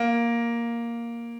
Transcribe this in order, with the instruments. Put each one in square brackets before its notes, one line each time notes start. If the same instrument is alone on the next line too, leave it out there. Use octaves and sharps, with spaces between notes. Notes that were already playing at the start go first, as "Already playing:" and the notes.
Already playing: [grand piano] A#3